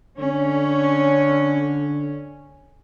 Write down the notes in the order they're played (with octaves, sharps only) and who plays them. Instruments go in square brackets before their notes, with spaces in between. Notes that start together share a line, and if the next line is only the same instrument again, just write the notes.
[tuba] D3 [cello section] C#4